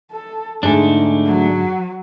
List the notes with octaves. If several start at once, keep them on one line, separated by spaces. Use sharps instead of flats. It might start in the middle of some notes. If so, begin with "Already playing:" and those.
A4
G#2 D3 A3 D4 D#4 G#4
F#3